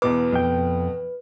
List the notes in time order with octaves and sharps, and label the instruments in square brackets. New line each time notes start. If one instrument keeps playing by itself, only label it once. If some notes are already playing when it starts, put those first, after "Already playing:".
[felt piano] E2 B2 D6 [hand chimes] B4
[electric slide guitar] F2 G5 [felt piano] B2